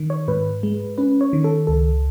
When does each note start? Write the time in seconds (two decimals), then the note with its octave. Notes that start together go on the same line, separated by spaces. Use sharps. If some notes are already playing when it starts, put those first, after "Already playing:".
Already playing: D#3
0.10 C#5
0.28 G#2 B4
0.63 G#3
0.98 C#4 B4
1.21 C#5
1.33 D#3
1.44 A4
1.67 C#2 A4